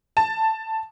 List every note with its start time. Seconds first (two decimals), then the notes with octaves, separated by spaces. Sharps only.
0.17 A5